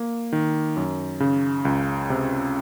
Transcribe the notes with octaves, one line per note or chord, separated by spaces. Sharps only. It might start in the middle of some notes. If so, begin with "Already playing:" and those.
Already playing: A#3
D#3
F#2
C#3
C#2
C3